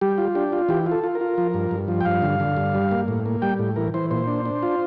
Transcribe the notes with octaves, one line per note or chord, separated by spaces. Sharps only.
G3 G4
F4
D4 G4
F4
E3 G4
F4
A4
F4
A#4
F4
F3
G2
G2
F3
G5
G2 F5
D3
D3
G2
G3
A#3
A2
A#3
G3 G5
A2
E3 A#4
E3 C5
A#2 C5
D4
D4
F4